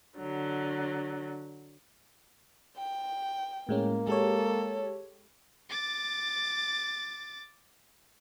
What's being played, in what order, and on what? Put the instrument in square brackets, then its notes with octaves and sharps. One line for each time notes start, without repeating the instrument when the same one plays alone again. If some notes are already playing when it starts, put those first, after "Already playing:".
[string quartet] D3 F#3
[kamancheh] G5
[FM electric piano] A2 G#3 C#4 [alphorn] A#3
[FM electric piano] G#3 G4 C#5 [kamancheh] A4
[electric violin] D6 A6